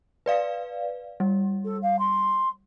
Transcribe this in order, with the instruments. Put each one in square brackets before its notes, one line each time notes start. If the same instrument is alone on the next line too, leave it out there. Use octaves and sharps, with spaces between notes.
[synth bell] B4 D5 F5
G3
[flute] A4
F5
C6